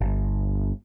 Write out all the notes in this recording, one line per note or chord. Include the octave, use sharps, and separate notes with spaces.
G1